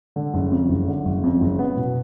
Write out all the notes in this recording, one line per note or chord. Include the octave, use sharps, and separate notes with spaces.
D3
F#1
F2
F#1
D3
F#1
F2
F#1
B3
B2